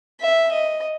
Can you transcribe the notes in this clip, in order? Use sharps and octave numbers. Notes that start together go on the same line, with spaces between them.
E5
D#5